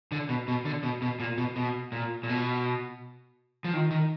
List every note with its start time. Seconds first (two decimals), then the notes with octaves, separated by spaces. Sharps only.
0.12 D3
0.29 B2
0.48 B2
0.65 D3
0.83 B2
1.02 B2
1.20 A#2
1.38 B2
1.56 B2
1.92 A#2
2.23 A#2
2.29 B2
3.64 F3
3.73 D#3
3.91 D#3